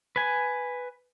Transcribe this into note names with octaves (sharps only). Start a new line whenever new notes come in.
B4 G#5